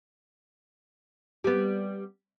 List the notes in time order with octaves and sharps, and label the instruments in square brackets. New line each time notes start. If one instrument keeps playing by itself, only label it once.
[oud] G3 B3